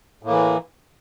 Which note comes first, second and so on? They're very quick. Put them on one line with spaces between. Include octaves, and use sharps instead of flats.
A2 A#3 E3